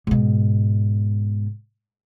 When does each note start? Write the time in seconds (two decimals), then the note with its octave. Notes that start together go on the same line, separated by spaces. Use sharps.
0.07 G#2 B2